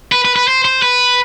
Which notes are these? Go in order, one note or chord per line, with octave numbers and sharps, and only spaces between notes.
B4
B4
B4
C5
C5
B4